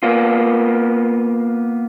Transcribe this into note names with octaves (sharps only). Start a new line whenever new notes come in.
A#3 B3 F4